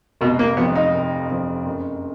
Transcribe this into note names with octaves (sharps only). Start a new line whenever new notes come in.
F1 B2
A#3
F2 F3 B3
D#4
F1
F2 F3
F#1